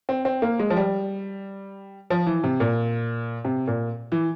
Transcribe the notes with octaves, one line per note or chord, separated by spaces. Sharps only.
C4
C4
A#3
G#3
F3
G3
F3
E3
C3
A#2
C3
A#2
E3